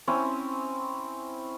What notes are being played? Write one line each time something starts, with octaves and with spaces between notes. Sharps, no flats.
C4 C#4 E4